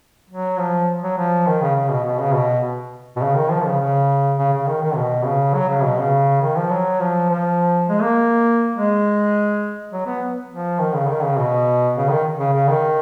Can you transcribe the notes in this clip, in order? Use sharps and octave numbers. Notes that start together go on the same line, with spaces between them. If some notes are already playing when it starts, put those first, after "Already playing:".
F#3
F3
F#3
F3
D#3
C#3
C#3
B2
B2
C#3
B2
B2
C#3
D#3
F3
C#3
C#3
C#3
C#3
D#3
D#3
B2
C#3
F#3
C#3
B2
C#3
D#3
F3
F#3
F3
F3
G#3
A#3
G#3
F#3
B3
F3
D#3
C#3
D#3
C#3
B2
C#3
D#3
C#3
C#3
D#3